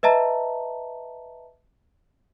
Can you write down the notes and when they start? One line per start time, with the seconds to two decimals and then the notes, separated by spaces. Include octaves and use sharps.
0.03 B4 D#5 E5 A5 A#5